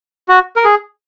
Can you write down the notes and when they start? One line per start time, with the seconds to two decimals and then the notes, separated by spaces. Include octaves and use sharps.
0.28 F#4
0.56 A#4
0.64 G#4